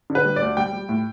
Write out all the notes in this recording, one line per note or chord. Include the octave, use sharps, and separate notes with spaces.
D3
B4
G3
D2 D5
G3 G5
G3
A2